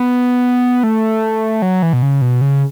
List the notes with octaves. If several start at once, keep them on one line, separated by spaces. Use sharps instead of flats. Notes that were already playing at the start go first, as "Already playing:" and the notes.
Already playing: B3
A3
F#3
E3
B2
C#3
B2
C#3